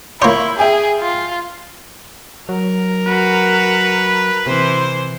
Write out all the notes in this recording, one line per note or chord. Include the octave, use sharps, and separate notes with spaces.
A#3 E4 C#5 C6 C#6 G6
G#4 E5 G5 G#5
F4
F#3 A#4
F#4 B4
C3 E3 C5